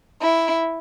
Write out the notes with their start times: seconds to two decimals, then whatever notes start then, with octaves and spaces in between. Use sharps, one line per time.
0.22 E4